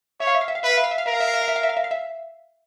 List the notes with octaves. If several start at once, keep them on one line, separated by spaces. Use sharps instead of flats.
C#5 E5
F5
E5
F5
E5
F5
B4 E5
F5
E5
F5
E5
F5
A#4 E5
F5
E5
F5
E5
F5
E5
F5
E5
F5
E5
F5
E5